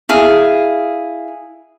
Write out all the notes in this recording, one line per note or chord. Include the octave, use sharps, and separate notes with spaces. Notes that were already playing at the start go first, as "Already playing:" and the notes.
E4 G#4 F5